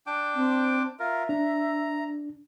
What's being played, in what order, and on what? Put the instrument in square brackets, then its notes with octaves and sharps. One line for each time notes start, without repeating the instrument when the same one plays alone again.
[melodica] D4 G5 D6
[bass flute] C4
[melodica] F4 A#4 [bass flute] E5
[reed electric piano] D4 [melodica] A#5